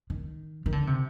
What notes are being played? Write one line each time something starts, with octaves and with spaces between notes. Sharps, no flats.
D#3
D#3
D3
C3